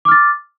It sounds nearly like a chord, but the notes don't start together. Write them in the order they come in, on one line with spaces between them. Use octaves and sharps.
D6 F6 A6